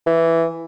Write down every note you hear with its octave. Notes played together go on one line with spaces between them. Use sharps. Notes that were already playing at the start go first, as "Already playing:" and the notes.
E3